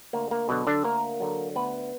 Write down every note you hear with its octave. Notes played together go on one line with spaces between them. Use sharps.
D2 A#3
A#3
B2 D3 F#3 B3
D3 D4
D2 A#3 A#4
D3 F#3
D2 B3 B4